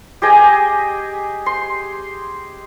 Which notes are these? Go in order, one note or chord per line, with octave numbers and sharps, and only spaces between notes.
G4 G#4 D#5 G#5
C6